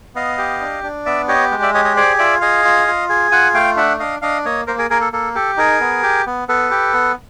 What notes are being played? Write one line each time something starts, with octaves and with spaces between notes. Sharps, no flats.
B3 D#5 F5
G4
D4
D4
B3 D5 E5
G4 C#5 D#5
G#3
D5 E5
G4 C#5 D#5
C#5 D#5
G#4 C5 D5
F4 D5 E5
G#4 D#5 F5
F4
F4
G#4
F4 F#5 G#5
A3 F5 G5
D4 E5 F#5
D4 D#5 F5
D4 D#5 F5
A#3 C#5 D#5
A#3 A#4 C5
G#4 A#4
A#3 G#4 A#4
A4
A#3 A4
G4 A4
D#4 G#4 A#4
B3
G4
B3
B3 A4 B4
G4
B3